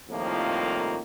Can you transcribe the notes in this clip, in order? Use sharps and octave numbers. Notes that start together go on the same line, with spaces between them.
C2 F2 A2 D#3 F3 A#3